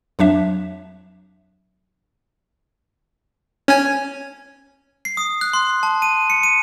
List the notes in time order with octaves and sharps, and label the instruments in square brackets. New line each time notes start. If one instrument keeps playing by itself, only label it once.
[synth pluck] F2 F#3 D4 E5
[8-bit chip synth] C#4 G#5
[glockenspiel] C7
D#6
F#6
C6
A5
D#7
C#7
D#7